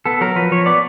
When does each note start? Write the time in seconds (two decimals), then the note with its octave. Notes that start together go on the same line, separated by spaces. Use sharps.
0.06 B3 A4
0.21 F#3 A#4
0.36 F3 B4
0.51 F3 C#5
0.66 B3 D5